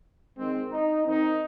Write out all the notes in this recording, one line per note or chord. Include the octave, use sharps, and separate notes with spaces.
D#3 G#3 C4
D#4
D#3 C4 D#4